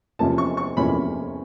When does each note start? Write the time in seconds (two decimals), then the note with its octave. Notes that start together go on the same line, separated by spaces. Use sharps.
0.19 E2 C3 F3 A#3 C#4 A5
0.38 C#6
0.57 C#6
0.77 E2 C3 F3 A#3 C#4 B5